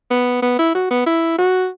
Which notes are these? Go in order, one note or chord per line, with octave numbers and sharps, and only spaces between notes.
B3
B3
E4
F#4
B3
E4
F#4